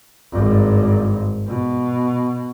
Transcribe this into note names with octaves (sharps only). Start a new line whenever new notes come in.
G#1 G2
B2